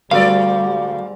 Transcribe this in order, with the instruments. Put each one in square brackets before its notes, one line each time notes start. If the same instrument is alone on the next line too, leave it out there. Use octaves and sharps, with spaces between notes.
[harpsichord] D2 [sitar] G#2 B3 D5 [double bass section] G3 [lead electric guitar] F5